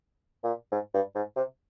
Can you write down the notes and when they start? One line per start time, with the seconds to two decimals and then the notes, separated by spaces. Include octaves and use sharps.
0.44 A#2
0.72 G#2
0.94 G2
1.15 G#2
1.36 C3